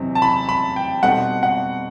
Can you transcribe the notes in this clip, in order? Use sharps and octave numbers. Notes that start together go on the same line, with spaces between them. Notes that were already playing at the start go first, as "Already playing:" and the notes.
Already playing: E2 C3 F#3 C4 D#4
A5
B5
B5
G5
B2 G3 C4 D#4 A4 F#5
F#5